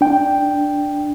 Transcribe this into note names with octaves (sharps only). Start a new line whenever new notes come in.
D4 G5